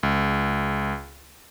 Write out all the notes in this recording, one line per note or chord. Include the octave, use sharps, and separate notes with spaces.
C#2